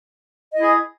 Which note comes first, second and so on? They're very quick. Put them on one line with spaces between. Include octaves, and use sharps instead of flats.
D#5 E4 G#4